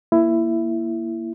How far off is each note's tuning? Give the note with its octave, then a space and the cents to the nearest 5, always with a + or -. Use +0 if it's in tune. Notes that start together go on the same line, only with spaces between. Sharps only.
A#3 +0 E4 +15